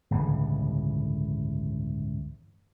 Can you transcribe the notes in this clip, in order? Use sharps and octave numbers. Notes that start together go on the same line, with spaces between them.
G1 C#2 A2 E3